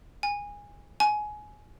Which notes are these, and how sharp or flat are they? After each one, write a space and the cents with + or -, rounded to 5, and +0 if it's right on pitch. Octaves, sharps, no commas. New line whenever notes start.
G#5 -20
G#5 +20